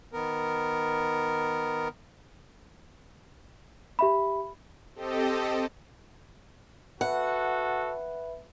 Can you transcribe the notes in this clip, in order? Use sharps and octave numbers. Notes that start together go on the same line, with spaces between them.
D#3 B3 A#4
G4 E5 B5
C4 G4 A4 D#5
F#4 A4 B4 E5 F#5 B5